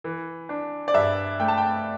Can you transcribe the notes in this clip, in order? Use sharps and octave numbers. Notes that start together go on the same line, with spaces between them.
E3
D4
D5
G2 E5
A3 G5
A5
G5